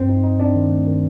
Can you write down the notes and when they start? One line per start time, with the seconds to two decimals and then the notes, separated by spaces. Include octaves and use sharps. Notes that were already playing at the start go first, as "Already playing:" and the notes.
Already playing: G2 C4 C5
0.09 D#4
0.24 D#4
0.39 C4 D4 D5
0.55 D#3
0.70 A3
0.87 D#3